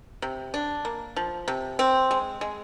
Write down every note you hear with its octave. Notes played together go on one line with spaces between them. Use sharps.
C3
D4
A#3
F3
C3
C4
G#3
G#3